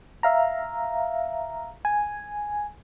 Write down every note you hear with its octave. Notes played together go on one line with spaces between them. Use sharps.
E5 F5 A#5
G#5